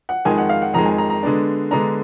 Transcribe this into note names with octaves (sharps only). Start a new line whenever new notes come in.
F#5
F2 D#3 G#3 G#5
F#5
F5
F#5
F2 D#3 G#3 A#5
G#5
A#5
A#5
D3 G#3 B3 D4
D3 G#3 B3 D4 A#5